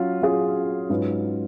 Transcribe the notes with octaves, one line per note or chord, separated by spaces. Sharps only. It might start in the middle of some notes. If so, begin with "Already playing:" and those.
Already playing: F#3 C#4 F4
F#3 C#4 F4 G#4
G#2 F#3 C#4 F4 B4